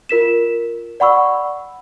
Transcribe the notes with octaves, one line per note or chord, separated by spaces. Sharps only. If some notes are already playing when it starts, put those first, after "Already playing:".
F4 A#4 B6 E7
D5 F#5 B5 C#6 E6